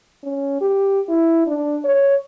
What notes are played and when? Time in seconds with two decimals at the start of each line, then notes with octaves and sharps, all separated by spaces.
0.24 C#4
0.61 G4
1.09 E4
1.47 D4
1.85 C#5